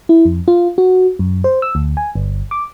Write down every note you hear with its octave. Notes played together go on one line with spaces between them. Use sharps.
E4
F2
F4
F#4
F#2
C5
E6
D2
G#5
G1
D6